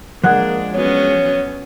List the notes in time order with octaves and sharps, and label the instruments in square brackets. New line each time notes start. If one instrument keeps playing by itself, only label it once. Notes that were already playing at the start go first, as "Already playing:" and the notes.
[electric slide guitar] F3 G#3 G#4 [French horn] A#3 [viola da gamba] D4 [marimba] F#5 F#6
[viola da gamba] F#3 B3 C#4 [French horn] C#5